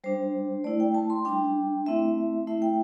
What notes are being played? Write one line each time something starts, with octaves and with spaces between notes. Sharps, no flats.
G3 D4 C5
A3 E4 D5
G5
A5
C6
G3 D4 G5
A3 C4 E4 E5
A3 E4 E5
G5